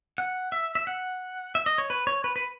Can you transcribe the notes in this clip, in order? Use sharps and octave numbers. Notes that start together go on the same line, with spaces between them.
F#5
E5
E5
F#5
E5
D#5
C#5
B4
C#5
B4
B4